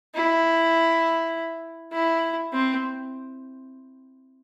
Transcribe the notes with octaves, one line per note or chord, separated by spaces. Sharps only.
E4
E4
C4